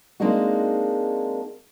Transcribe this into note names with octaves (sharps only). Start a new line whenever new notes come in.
G#3 A#3 C4 D4 D#4 F#4